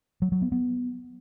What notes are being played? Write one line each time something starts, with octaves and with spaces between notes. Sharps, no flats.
F#3
F#3
B3
B3